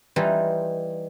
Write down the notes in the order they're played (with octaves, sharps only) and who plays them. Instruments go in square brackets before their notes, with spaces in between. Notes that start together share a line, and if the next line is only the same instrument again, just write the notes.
[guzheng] E3 G3 D#4 F4